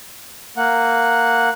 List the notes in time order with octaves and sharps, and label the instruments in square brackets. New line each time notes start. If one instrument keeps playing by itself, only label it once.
[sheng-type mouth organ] A#3 F#5